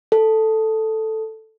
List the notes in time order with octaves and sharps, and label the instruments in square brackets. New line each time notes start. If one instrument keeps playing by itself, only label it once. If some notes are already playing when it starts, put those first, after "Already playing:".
[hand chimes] A4